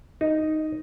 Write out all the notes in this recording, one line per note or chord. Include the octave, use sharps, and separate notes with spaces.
D#4